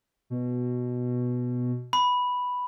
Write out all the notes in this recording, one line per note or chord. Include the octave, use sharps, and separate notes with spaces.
B2
B5